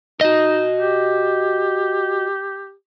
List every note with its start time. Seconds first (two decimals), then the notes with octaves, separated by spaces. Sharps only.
0.21 D#4 F#4 D#5
0.79 G4